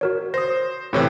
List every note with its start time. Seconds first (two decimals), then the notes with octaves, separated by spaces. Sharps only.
0.01 F#4 A#4 C#5
0.34 C5 D#6 A#6
0.93 A2 C3 E3 E4 C#5 C#6